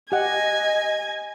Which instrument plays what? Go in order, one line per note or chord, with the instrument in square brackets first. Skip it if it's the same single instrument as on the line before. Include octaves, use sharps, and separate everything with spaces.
[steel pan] G4 F#5 [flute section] D#5 [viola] G#5